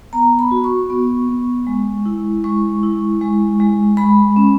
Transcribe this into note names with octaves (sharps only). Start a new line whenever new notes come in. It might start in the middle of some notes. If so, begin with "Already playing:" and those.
B3 A#5
B5
F#4
C#6
B3
B3
G#3
E4
G#3 C#6
E4
G#3
G#3
G#3 B5
C#4